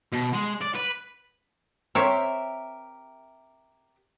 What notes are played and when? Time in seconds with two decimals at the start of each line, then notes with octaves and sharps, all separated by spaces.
0.12 B2
0.34 G#3
0.62 D5
0.75 B4
1.95 C4 G4 A#4 C#5 E5